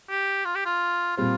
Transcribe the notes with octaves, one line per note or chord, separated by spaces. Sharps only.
G4
F4
G4
F4
A#2 G3 C4 F4